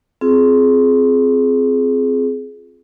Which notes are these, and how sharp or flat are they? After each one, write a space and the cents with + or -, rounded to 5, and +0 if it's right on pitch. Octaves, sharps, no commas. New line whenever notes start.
C4 -5 F4 +0 G#4 +20